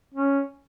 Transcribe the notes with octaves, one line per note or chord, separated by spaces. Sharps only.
C#4